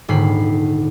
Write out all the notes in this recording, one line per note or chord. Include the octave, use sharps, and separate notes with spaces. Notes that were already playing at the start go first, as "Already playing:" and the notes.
D#1 G#2 D3 B5 C7